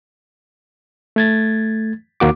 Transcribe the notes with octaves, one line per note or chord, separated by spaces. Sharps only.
A3 G#6 A6
D#2 A#3 F#4 D6